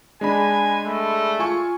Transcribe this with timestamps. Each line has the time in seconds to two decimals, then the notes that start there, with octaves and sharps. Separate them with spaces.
0.21 G#3 D4 G#5 B5
0.86 A3
1.39 F4 G#5 C#6